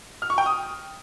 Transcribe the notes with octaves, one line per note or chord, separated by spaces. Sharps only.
F6
C#6
G5
D#6